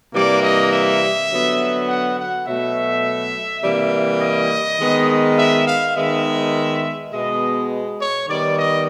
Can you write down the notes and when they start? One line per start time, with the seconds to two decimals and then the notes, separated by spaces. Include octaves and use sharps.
0.14 C3 E3 G3 A#3 D5
0.43 D#5
0.72 E5
1.30 D3 F#3 B3
1.88 F#5
2.17 F#5
2.46 B2 F#3 A3 E5
3.63 C3 E3 G3 A#3
4.21 D#5
4.79 D#3 G#3 B3
5.37 E5
5.67 F5
5.95 D#3 G#3 B3 E5
7.12 B2 G#3 B3 D#5
7.99 C#5
8.28 D#3 G3 B3 D5
8.57 D#5